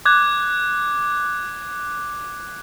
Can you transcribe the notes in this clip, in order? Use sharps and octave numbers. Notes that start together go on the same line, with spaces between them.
D6 F#6 G#6